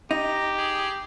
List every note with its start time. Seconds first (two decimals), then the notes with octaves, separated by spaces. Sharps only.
0.11 D#4 G4 A#5
0.58 G#4